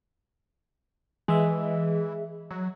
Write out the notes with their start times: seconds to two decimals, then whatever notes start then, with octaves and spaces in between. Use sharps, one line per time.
1.28 E3 G#3 E5
2.50 F#3